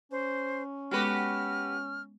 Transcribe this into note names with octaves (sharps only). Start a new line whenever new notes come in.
C#4 C5
G#3 B3 F#4 G4 A4 B4 F6